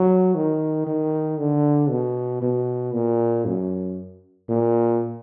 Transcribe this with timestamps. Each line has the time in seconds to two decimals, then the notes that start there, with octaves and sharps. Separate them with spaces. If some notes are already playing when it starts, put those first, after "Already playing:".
Already playing: F#3
0.35 D#3
0.87 D#3
1.38 D3
1.90 B2
2.42 B2
2.93 A#2
3.45 F#2
4.49 A#2